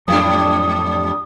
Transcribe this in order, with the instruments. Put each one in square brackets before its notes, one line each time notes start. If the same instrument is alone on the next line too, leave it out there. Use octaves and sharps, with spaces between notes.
[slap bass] F2 F#3 [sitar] G#2 G3 D4 [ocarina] D#6